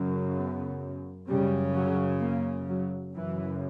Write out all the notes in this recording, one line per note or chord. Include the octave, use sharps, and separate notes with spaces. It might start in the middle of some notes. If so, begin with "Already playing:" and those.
Already playing: F#2 C#3
B3
F#2 C#3 G3
F#3
A#3
F#3
F#2 C#3 E3